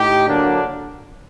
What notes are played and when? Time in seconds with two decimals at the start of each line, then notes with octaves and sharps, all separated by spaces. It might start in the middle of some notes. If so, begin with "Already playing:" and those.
Already playing: A2 D#4 G4
0.26 D3 F#3 A#3 D4